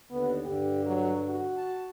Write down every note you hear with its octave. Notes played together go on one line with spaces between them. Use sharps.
D#2 D3 B3
G2 D3 G4
F#3
F#4
A5